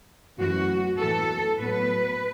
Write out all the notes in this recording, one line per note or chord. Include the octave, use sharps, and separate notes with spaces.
F#2 E3 A3 F#4
A2 E3 B3 A4
A2 F#3 B3 B4